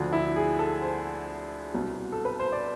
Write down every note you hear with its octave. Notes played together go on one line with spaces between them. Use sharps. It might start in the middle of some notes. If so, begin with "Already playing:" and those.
Already playing: D2 D3 F3
E4
G#4
A4
C5
C2 B2
A4
B4
C5
D5